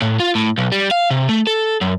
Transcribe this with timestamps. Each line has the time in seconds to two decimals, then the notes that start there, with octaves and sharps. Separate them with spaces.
0.02 A2
0.20 F4
0.35 A2
0.58 B1
0.72 G3
0.91 F5
1.11 C3
1.29 A3
1.47 A4
1.81 F#2